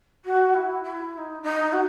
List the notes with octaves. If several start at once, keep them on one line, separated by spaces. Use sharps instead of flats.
F#4
E4
E4
E4
D#4
D#4
F#4